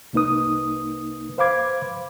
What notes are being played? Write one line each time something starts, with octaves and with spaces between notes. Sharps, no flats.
C2 A#3 D#4 B4 D#6
B4 C5 F5 B5 D6 G#6